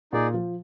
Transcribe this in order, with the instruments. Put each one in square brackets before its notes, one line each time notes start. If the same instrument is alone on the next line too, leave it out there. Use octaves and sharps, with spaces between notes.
[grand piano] A#2 [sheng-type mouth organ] D#4 G#4 D5
[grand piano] F3